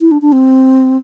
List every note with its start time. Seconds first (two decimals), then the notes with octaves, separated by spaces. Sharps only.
0.01 E4
0.11 D4
0.22 D4
0.32 C4